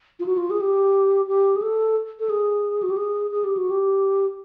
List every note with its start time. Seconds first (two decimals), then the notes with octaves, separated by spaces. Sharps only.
0.20 F4
0.26 F#4
0.38 F4
0.50 G#4
0.60 G4
1.27 G4
1.56 G#4
1.62 A4
2.19 A4
2.30 G#4
2.83 F#4
2.90 G4
2.97 G#4
3.31 G#4
3.44 G4
3.57 F#4
3.70 G4